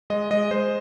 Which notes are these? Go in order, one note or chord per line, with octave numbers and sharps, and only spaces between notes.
G#3 D#5
G#3 D#5
G#3 C5